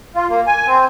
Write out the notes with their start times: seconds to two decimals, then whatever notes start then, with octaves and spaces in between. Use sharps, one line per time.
0.15 F4
0.30 A#3
0.47 G#5
0.67 C4